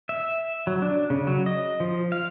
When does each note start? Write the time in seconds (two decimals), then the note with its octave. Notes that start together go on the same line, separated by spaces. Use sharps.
0.09 E5
0.67 F#3
0.82 D4
1.10 C#3
1.27 F#3
1.46 D#5
1.80 F3
2.12 F5